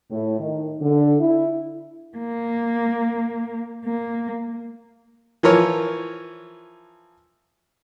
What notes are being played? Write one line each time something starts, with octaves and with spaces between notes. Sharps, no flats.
A2
D#3
D3
E4
A#3
A#3
E3 F3 A#4 C#5